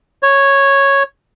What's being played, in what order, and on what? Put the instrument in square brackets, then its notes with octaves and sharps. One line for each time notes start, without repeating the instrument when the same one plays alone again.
[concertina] C#5